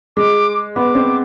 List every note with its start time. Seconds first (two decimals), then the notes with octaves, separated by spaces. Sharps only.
0.17 G#3 D6
0.75 B3 D6
0.95 C4